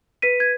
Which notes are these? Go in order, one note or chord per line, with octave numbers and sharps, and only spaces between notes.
B4 B6 D#7
G#6